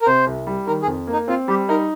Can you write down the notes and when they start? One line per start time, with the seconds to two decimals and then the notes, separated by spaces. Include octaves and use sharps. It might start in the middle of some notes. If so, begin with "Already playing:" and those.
0.02 A#4
0.06 C3 C5
0.26 C2
0.47 G3
0.67 D#3 A#4
0.82 G#4
0.87 F2
1.07 A#3
1.13 D#4
1.28 C4 F4
1.48 G3 G4
1.69 D#4 A#4